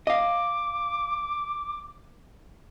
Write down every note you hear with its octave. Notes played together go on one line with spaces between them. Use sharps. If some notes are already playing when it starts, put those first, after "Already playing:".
D#5 F5 D6